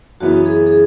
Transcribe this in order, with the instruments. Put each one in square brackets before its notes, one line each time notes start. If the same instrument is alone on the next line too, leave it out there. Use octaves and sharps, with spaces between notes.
[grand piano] F#2 C#3 E3 B3 E4 [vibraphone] F#4
[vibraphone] G#4
G#4